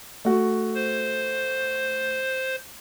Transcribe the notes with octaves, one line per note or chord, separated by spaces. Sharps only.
A3 F#4
C5